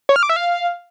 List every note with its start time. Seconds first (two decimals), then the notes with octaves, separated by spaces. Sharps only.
0.09 C#5
0.16 F6
0.23 D6
0.29 E5
0.36 F5